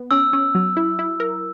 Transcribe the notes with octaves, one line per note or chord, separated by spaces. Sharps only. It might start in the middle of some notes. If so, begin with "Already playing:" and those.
Already playing: B3
C#4 E6
C#4
F#3
E4
E4
A#4